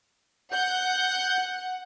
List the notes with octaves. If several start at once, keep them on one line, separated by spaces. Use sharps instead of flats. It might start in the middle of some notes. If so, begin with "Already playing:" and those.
F#5 G6